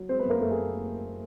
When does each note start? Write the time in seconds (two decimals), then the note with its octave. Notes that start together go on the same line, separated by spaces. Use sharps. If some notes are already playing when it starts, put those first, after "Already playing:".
Already playing: F#3
0.09 G#3 C4 C5
0.19 B3 B4
0.25 F#2 A#3 A#4
0.40 F#1 A3 A4
0.51 G#4